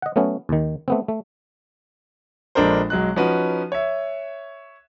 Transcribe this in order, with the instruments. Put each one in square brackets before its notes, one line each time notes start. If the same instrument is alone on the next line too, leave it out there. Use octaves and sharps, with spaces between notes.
[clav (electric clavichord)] D#5 F#5
F#3 A3 B3 C#4
D#2 D#3
A3 B3 C4
A3
[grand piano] A#1 G#3 D4 A4 A#4 C5
B1 F#3 G#3 F#6
F3 C#4 D#4 F#4 B4
C#5 E5